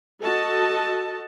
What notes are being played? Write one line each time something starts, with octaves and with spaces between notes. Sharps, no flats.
F#4 A4 D#5 A5